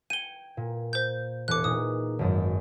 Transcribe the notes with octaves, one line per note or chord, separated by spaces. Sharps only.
G5 G#6 C#7 D#7 G7
A#2
C5 G6
E1 G#4 D6 F#6 C#7
A#2 D#4 D#6
G#1 F#2